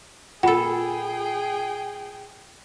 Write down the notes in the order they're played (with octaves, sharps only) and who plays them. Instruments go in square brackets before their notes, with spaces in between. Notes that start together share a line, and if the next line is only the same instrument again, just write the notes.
[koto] A#2 A4 [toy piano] F4 B5 [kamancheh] G#4 G5 [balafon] F#5